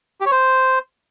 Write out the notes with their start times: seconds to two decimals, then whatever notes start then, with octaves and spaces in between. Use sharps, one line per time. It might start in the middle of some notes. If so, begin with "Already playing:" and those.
0.21 G4
0.26 C#5
0.31 C5